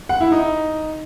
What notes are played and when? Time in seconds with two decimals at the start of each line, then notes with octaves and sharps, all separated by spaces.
0.09 F#5
0.21 E4
0.32 D#4